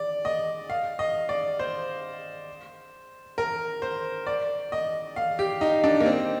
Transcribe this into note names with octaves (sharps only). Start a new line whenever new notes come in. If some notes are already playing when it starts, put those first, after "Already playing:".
Already playing: D5
D#5
F5
D#5
D5
C5
A#4
C5
D5
D#5
F5
G4
D#4
D4
A#3
C4